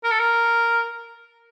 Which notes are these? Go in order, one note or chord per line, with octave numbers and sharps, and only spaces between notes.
A#4
A4
A#4